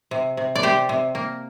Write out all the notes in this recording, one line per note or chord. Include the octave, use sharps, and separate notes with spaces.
C3
C3
D5
C3 G4 C5
C3
A#3